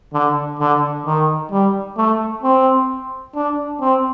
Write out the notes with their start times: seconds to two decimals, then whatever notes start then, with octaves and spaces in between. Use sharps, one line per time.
0.13 D3
0.60 D3
1.06 D#3
1.51 G3
1.97 A3
2.43 C4
3.35 D4
3.81 C4